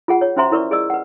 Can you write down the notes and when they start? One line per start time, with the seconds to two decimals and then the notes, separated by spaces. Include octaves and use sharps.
0.08 F4 G#4 F#5
0.21 C#5
0.36 C#4 F#4 C5 E5 A#5 C6
0.52 E4 A#4 B4 D5 C#6
0.71 G#4 B4 D5 D#5 E6
0.90 B4 F#5